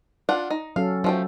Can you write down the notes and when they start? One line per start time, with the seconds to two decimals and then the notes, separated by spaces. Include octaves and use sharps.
0.29 D4 F4 F#5
0.50 D#4
0.76 F#3 C#4 A4 F5
1.04 F3 F#3 A3 G5